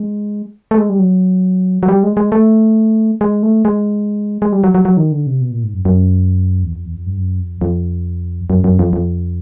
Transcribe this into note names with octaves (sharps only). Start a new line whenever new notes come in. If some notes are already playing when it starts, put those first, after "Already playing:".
Already playing: G#3
A3
G#3
G3
F#3
F#3
G3
G#3
G#3
A3
G#3
A3
G#3
G#3
G3
F#3
F#3
F#3
D#3
D3
C3
B2
A#2
G#2
F#2
F#2
E2
F2
E2
F2
G2
F#2
F2
F2
F#2
F#2
F2
F2